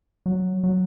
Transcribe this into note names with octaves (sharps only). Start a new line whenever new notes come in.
F#3
F#3